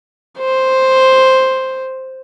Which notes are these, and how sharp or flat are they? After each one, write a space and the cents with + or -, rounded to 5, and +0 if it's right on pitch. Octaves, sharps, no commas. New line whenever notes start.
C5 +0